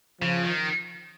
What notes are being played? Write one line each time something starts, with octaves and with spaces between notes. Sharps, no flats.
C#3 F3
D#3